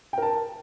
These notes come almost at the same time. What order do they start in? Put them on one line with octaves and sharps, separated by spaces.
G5 A#4 A5